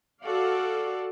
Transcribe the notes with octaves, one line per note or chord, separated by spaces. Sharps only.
F#4 A4 D5 F5